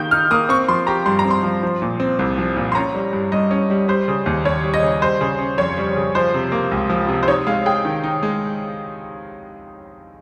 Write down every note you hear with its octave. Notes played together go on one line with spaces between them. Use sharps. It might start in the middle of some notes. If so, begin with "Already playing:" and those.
Already playing: D#3 A#3 G4 G6
D#4 F6
A#3 D#6
C4 C#6
F3 C6
G4 A#5
G2 C6
A#5
C4
C6
F3
F3
A#2
C4
C2
F3
A#2
C6
C#4 A#5
G3
G2
G2 D#5
C#4
G3
G3 C5
C#3
D#2
D#2 C#5
G3
D#5
C#3
G3 C5
C#3
C#4
F2 C#5
G3
C#3
F3 C5
C3
A#3
C#2
F3
C3
C5
D#4 C#5
G#3 F5
G#4 G5
D#3
D#4
G#3